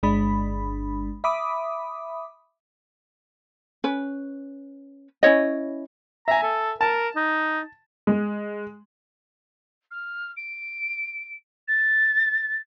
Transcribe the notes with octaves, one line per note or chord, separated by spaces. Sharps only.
G1 G#3 D4 B5
E5 B5 D6 D#6
C#4 B4
C#4 E4 C#5 D#5
E5 G#5 A#5
A4
A#4 A5
D#4
G#3
F6
D7
A6